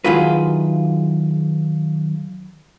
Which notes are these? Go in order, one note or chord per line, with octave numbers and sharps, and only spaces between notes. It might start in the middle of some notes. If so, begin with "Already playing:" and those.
D#3 F#3 E4 F4 G#4 B4